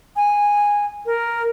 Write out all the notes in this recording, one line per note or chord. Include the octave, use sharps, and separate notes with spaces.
G#5
A#4